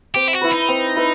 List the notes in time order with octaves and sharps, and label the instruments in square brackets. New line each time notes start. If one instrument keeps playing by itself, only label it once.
[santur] C4 [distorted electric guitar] G4
[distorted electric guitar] E4
F#4
[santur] E4 B4
[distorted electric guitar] D#4
[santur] C4
E4 B4